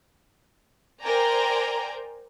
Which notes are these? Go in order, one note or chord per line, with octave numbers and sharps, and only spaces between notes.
A#4 C5 D5 G5 G#5 A#5